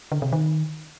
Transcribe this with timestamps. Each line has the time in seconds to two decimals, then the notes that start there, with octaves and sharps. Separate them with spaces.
0.12 D3
0.22 C3
0.33 D#3